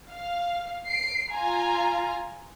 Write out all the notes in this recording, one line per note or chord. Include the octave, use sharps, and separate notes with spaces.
F5
C7 D7
F4 G#5 A#5